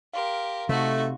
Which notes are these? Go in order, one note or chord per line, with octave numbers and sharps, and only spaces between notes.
G4 A#4 F5 C6
C3 A3 D#4 F#4